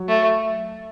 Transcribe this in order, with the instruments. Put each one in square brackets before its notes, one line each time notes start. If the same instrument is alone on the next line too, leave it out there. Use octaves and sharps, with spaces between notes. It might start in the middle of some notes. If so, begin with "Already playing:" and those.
Already playing: [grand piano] F#3
[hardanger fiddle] A3